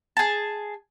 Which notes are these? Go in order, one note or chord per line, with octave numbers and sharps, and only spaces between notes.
G#4 A5